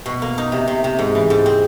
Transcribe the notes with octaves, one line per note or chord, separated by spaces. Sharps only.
B2
A#3
D#4
C3
C3
C3
G#2
E3
G#2
C4